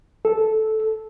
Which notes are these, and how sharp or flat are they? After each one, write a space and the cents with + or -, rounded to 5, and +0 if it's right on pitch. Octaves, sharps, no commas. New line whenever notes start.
A4 -10